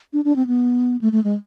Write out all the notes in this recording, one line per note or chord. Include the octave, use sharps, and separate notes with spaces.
D4
D4
C4
B3
A3
A3
G#3